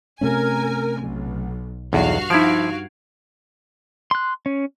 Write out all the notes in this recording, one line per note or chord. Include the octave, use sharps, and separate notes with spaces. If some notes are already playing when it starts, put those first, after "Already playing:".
C3 A3 C#4 A#4 G#5
B1
B1 E2 G2 F#4 F5
F3 D#4 E4 G#6 D7
C6 F#6
C#4